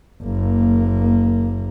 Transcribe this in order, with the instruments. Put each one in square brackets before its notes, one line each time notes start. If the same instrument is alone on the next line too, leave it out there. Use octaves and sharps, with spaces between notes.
[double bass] F#1 A#3